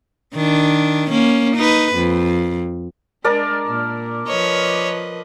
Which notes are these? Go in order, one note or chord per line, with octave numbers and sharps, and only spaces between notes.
D#3 D4
A#3 C#4
D#4 B4
F2
G#3 D4 A#4 D5 A5
A#2
F3 B4 C#5 D#5